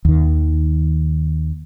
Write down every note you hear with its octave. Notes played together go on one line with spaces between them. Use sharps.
D#2 D#3